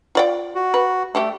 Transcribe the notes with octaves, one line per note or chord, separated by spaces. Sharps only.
F4 D5 G5
F#4
B4
G3 A3 G4 A4